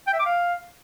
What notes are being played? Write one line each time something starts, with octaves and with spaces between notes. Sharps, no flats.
G5
E5
D6
F5